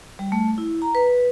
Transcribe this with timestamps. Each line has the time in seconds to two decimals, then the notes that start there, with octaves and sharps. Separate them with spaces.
0.19 G3
0.32 A3
0.58 E4
0.82 A#5
0.95 B4